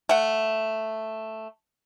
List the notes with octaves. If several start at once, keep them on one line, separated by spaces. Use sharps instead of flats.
A3 F#5